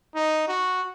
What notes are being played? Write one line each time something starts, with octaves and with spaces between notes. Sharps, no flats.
D#4
F#4